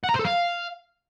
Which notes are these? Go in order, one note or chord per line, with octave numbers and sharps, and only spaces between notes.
F#5
A#5
C5
A4
F5